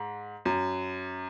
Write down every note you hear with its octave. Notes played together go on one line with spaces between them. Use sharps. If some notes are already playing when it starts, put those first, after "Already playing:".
Already playing: G#2
F#2